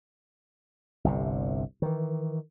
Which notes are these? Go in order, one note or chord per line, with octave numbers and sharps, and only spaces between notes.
G1 C2 C3
D#3 E3